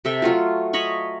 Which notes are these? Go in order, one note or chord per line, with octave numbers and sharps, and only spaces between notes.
C3 A4 E5 G5
F#3 A3 F4
C#5 D#5 B5 C#6